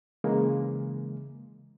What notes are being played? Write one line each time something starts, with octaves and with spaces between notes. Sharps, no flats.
C#3 E3 G#3 A#3